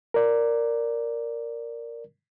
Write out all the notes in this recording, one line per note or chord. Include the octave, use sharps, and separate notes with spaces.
A#4 D5